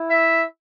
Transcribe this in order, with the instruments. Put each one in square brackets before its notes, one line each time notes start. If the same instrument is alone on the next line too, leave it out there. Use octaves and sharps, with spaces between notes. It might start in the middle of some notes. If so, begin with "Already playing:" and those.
Already playing: [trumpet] E4
[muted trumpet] E5